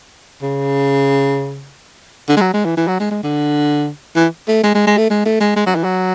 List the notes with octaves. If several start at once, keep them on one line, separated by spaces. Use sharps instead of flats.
C#3
D3
G#3
F#3
G#3
E3
E3
F#3
G#3
G#3
D3
E3
A3
G#3
G#3
G#3
A3
G#3
A3
G#3
G#3
F#3
E3
F#3